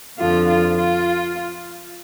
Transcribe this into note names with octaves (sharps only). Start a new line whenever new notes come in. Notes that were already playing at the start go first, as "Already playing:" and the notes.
F2 D3 F3 F4
F4
F4